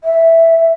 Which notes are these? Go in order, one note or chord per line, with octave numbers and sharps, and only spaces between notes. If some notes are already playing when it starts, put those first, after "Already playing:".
E5